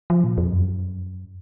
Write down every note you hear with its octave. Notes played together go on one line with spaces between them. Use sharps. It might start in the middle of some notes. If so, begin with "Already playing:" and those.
F3
A#2
F2
F#2